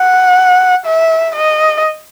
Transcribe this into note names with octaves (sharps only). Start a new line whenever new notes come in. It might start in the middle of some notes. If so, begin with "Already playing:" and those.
Already playing: F#5
E5
D#5